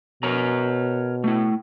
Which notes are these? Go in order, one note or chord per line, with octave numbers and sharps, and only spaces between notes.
B2 A#4 C#5 A#5
A3 E4